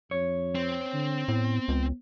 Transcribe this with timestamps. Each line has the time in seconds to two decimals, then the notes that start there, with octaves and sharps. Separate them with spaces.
0.11 F2 C#5
0.55 C4
0.94 D3
1.28 A2 B3
1.68 C#2